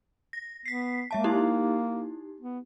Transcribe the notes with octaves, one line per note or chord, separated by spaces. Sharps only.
A#6
B3 B6 C7
G#3 A#3 E5 A5
D#4 E4 G4
B3